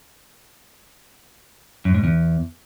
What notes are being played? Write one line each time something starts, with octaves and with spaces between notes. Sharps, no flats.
F#2
G#2
E2